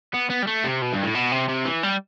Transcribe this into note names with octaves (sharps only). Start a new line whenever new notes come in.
B3
B3
G3
A3
C3
B2
G2
A2
B2
C3
C3
E3
G3